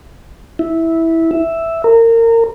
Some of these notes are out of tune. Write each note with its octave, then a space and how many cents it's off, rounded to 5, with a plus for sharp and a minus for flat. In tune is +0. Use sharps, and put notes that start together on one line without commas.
E4 -10
E5 +0
A#4 -25